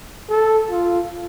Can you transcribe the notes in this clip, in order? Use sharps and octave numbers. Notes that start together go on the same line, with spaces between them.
A4
F4